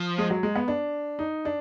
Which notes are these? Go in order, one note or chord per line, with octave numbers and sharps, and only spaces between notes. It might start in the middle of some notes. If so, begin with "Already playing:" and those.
Already playing: F3
G#3
F#3
G#3
B3
D4
D#4
D4